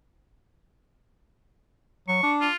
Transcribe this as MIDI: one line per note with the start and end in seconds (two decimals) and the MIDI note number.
2.08 2.19 54
2.08 2.31 85
2.23 2.48 62
2.41 2.56 65